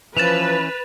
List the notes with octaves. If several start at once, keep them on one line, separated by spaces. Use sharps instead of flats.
E3 F3 C#4 B4 A6 E7 F7